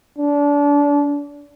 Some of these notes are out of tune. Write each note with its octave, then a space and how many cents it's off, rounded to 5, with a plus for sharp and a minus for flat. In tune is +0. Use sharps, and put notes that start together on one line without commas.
D4 -25